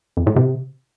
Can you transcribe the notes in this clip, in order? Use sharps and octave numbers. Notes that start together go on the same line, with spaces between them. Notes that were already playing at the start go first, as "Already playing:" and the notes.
F2
A2
C3